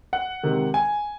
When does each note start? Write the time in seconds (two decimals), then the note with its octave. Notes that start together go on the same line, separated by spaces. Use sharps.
0.13 F#5
0.43 C3 D#3 G#3
0.74 G#5